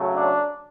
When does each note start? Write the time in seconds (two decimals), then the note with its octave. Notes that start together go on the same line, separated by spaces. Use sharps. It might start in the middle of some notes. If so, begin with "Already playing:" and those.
Already playing: C#3 F#3 A3
0.14 D4